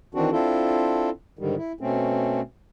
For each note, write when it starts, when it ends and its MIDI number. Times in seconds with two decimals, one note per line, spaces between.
0.15 0.30 51
0.15 0.30 52
0.15 0.30 60
0.15 0.30 62
0.15 0.30 66
0.32 1.10 60
0.32 1.10 62
0.32 1.10 64
0.32 1.10 65
0.32 1.10 69
1.39 1.55 44
1.39 1.55 50
1.39 1.55 51
1.39 1.55 55
1.57 1.72 64
1.81 2.41 47
1.81 2.41 57
1.81 2.41 60
1.81 2.41 61